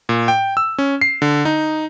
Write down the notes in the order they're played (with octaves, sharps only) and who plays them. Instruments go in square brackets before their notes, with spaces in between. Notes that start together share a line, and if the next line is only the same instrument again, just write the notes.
[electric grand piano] A#2
G5
E6
C#4
C7
D3
D#4